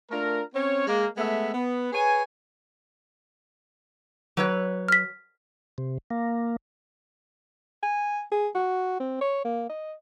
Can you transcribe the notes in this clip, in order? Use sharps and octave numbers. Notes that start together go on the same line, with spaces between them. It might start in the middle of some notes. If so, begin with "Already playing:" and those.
A3 D4 F4 A#4
C4 C#4 C#5
G#3 A#3
G#3 A3 B3 E5
B3
G#4 B4 C#5 G#5
F#3 B4 C#5
F6 B6
C3
A#3
G#5
G#4
F#4
C4
C#5
A#3
D#5